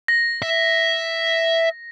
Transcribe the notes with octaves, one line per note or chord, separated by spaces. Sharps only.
A#6
E5